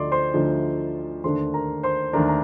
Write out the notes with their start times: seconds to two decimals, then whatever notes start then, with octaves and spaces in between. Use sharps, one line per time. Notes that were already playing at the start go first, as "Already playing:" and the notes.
Already playing: D2 D3 F3 A3 D#4 D5 C6 D6
0.12 C5 C6
0.34 D2 D3 F3 A3 D#4
1.24 D#2 D3 A3 D4 C5 C6
1.54 A#4 A#5
1.83 C5 C6
2.13 D#2 D3 A3 D4 A#4 A#5
2.28 A#5